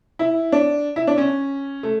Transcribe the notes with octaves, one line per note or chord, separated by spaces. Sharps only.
E4
D4
E4
D4
C#4
A3